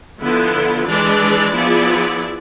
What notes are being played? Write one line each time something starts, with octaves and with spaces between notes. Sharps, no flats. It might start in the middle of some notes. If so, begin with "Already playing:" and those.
D3 F3 B3 E4
E3 G#3 D4 G#4 D5
F3 B3 E4 G#4 D5